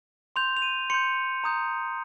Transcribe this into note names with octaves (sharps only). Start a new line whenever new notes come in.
C6 G6 F7
F7
D#7
C6 G6 C#7
A#5 D#6 G6